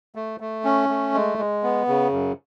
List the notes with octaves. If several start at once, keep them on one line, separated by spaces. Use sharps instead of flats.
A3
A3
C#4
A3
G#3
G#3
B3
C#3
F#2